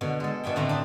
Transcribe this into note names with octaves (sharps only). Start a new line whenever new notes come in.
B2 D3
G#3 A4
B2 D4 E5 G5
A2 D3 A3 C4 B4 A#5
D4 D#4